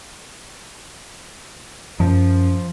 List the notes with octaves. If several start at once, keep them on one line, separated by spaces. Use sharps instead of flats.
F#2 F3